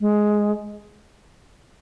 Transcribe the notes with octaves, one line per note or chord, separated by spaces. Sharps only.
G#3